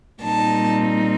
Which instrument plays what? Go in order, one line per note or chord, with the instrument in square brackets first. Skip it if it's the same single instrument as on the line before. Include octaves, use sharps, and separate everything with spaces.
[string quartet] A#2 G3 C4 D#4 A5